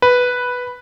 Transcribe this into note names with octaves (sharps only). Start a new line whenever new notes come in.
B4